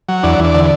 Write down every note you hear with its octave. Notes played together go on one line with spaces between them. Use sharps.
F#3
E2 D4
E2
D4
D3